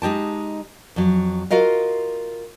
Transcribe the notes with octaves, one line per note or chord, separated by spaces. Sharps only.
G#3 D#4 G4 A5
F2 F#3
F4 F#4 A#4 D#5 F5